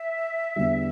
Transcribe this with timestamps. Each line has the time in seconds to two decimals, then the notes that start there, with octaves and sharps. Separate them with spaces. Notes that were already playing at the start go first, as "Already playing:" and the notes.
Already playing: E5
0.56 E2 D3 G3